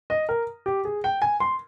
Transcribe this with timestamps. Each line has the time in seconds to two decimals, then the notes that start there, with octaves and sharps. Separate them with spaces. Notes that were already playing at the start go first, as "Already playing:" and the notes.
0.10 D#5
0.29 A#4
0.66 G4
0.85 G#4
1.04 G5
1.22 G#5
1.40 C6